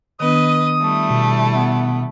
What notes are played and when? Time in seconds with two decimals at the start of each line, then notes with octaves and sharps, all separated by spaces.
0.20 D#3 B3 D4 B4 D#5 D#6
0.79 G3 A3 E4
1.10 B2
1.55 B3